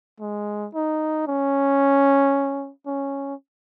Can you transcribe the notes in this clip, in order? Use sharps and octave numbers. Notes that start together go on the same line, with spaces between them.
G#3
D#4
C#4
C#4